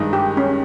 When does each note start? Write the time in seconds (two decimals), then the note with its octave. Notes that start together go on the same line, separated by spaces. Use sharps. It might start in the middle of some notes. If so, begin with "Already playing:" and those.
Already playing: G2 D#3 G#3 D#4
0.13 G4
0.37 C#4